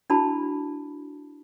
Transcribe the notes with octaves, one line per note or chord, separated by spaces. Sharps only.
D4 E4 F#4 A5 B5